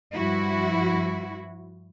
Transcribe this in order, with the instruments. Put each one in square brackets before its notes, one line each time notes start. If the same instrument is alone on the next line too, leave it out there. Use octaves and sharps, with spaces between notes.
[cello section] G2 F3 E4 F#4